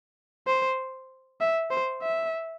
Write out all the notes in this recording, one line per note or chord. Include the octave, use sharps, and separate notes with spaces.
C5
E5
C5
E5